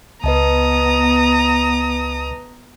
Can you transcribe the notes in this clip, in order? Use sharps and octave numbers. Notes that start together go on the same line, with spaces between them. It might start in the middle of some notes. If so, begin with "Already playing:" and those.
C#2 B3 B4 D#5 A5 A#5 D#6